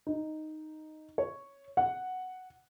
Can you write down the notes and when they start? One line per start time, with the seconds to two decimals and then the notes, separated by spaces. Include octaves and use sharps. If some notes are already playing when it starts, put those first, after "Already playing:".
0.07 D#4
1.18 C#5
1.77 F#5